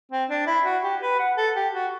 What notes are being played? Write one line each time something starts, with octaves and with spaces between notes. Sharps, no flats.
C4
D4
E4
F#4
G4
B4
F#5
A4
G4
F#4